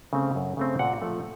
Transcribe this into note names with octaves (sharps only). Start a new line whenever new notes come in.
C#3 A3 C4
F#2
C#3 A3 C4
A#2 F#5
F3 A3